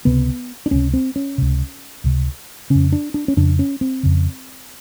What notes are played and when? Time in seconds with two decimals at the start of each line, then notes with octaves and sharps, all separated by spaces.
0.05 C#2 C3 B3
0.66 D4
0.71 C#2 C3 C#4
0.94 C4
1.16 C#4
1.38 C#2 C3
2.04 C#2 C3
2.70 F2 C#3 C#4
2.92 D4
3.14 D4
3.28 C#4
3.37 F2 C#3 D4
3.59 C#4
3.81 C4
4.03 F2 C#3